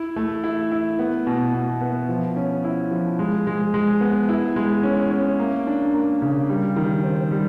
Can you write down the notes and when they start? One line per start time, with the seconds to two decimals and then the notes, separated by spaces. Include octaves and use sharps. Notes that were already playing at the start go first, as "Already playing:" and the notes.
Already playing: E4
0.16 A3
0.44 E4
0.72 E4
0.99 B3
1.27 B2
1.54 B2
1.81 B3
2.09 F3
2.36 C#4
2.64 E4
2.91 F3
3.19 G#3
3.47 G#3
3.74 G#3
4.01 B3
4.29 E4
4.56 G#3
4.83 C#4
5.11 C#4
5.39 A#3
5.67 D4
5.94 A#3
6.22 C#3
6.49 G3
6.76 D#3
7.04 C4
7.31 G3